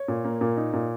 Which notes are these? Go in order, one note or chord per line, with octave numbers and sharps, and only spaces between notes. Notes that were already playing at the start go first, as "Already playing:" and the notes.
Already playing: C#5
A#2
A#3
A#2
D#4
A#2